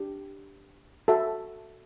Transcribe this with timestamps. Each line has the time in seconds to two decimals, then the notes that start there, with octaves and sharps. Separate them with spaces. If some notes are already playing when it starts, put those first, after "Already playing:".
Already playing: D4 G4
1.08 F#4 A4 E5